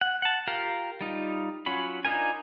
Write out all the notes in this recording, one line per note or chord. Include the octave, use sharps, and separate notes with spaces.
F#5
F#5 A5
F4 G4 A#4 F5
G3 D#4 F4
F#3 C#4 F4 F#4 B5
D4 D#4 F4 A#4 G#5